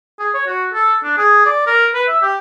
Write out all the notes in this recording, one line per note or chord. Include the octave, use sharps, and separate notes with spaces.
G#4
C#5
F#4
A4
D4
G#4
D5
A#4
B4
E5
G4